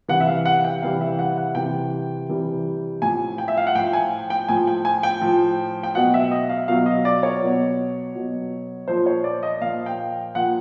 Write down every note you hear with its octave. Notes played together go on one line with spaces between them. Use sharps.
C3 E3 G3 F#5
E5
F5
F#5
G5
C3 E3 G3 F5
E5
F#5
F#5
C3 E3 G3 G5
C3 E3 G3
A2 F3 G#5
G5
E5
F5
F#5
A2 F3 G5
G#5
G5
A2 F3 G#5
G5
G#5
G5
A2 F3
G5
B2 F#3 F#5
E5
D#5
F5
B2 F#3 F5
D#5
D5
C#5
B2 F#3
B2 F#3
A#2 F3 C5
C#5
D5
D#5
A#2 F3 F5
G5
A#2 F3 F#5